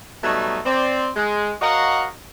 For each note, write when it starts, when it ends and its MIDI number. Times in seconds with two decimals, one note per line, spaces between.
0.23 0.59 47
0.23 0.59 54
0.23 0.59 55
0.23 0.59 57
0.23 0.59 63
0.65 1.10 60
0.65 1.10 74
1.16 1.52 56
1.61 2.06 66
1.61 2.06 70
1.61 2.06 73
1.61 2.06 75
1.61 2.06 77
1.61 2.06 78